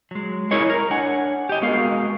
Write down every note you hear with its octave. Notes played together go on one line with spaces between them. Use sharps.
F#3 G#3
E4 G#4 A#4 C#5 D#5
A#4
D4 C#5 F#5 G#5
G4 D#5
G#3 B3 F#4 G#4 A#4 F5